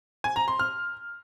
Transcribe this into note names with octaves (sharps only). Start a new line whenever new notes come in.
G#5
A#5
C6
F6